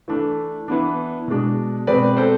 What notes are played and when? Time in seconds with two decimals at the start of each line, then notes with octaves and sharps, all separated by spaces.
0.08 E3 A3 D4
0.68 E3 B3 D4
1.28 B2 G#3 D4
1.87 B2 G#3 C4 B4 D5
2.17 A4 C5